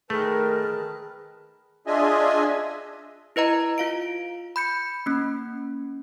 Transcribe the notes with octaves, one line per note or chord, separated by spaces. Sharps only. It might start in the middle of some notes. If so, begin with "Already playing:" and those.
D#3 A3 G#4 A#4 B4 A5
D4 F4 G#4 D#5 E5 G#5
E4 B4 D#5 A#5
F4 F5 D7
B5 G6 C#7
A#3 C#4